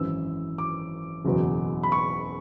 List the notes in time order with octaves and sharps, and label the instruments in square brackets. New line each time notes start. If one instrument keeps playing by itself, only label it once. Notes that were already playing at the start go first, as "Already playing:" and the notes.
Already playing: [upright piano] G#1 F#2 E3 E6
D6
F#1 E2 B2 F#3
B5
C#6